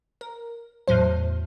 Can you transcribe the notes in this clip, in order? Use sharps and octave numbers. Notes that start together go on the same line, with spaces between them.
A#4
E2 A2 F#3 C5